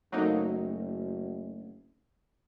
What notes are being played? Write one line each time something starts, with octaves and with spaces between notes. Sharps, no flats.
F#1 F#3 A3 A#3 C4 D#4 F#4